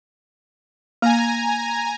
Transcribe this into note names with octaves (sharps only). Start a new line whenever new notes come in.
A#3 G#5 A#5